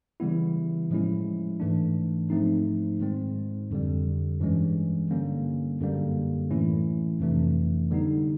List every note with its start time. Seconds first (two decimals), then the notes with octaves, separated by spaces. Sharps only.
0.20 C#3 E3 G3 B3 E4
0.90 A2 F3 G#3 C#4 E4
1.60 G#2 E3 A3 D4
2.30 G#2 F3 A3 C4 D#4
3.00 G#2 D#3 G#3 C4
3.71 F2 D3 G3
4.40 G2 E3 G#3 C#4
5.11 G2 D3 G3 A#3 C#4
5.81 F#2 D3 G3 A#3
6.50 A2 E3 A3 C#4 E4
7.20 F2 C3 E3 A3 D4
7.90 D3 G3 B3 D#4